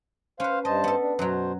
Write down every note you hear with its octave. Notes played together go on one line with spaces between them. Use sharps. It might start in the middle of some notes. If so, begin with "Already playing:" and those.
C#4 B4 C5 F5
G2 C5 D#5 A5
B3 A4
D4
F#2 B2 F#3 C5